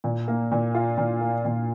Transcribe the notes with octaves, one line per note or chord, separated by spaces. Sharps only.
A#2
A#3
A#2
F4
A#2
A#3
A#2